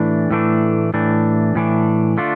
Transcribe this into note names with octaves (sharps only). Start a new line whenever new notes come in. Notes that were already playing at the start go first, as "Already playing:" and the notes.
Already playing: A2 E3 A3 D4
A2 E3 A3 D4
A2 E3 A3 D4
A2 E3 A3 D4
D3 A3 D4 F4